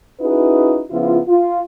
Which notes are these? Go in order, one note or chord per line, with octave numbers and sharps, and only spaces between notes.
C#4 D#4 E4 F#4 G#4 B4
C#3 F3 B3 E4 F4
F4